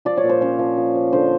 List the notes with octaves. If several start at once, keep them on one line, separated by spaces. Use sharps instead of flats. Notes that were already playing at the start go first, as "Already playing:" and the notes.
F3 D5
C#5
A#2
C5
C#4 C#5
F3
F3
F3
D3 C5